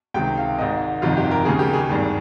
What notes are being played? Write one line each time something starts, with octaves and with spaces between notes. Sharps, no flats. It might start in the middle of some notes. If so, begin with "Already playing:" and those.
C#2 C3 D#3 G5
F5
G#1 G#2 D#3 D#5
G1 F2 C3 D#3 F4
G4
A#4
D#2 C#3 G#4
G4
G#4
G#1 G2 D#3